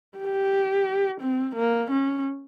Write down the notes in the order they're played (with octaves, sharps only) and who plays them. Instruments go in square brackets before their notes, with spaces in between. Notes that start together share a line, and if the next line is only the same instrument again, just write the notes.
[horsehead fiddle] G4
C4
A#3
C#4